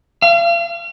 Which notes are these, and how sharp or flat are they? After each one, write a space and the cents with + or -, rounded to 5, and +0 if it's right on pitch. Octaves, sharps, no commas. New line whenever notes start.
F5 -40